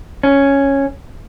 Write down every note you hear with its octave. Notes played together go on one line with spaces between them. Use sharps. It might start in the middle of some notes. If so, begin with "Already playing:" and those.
C#4